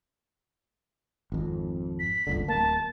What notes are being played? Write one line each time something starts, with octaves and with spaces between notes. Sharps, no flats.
G#1 F2
B6
G1 C#2 D3
D1 A#3 A5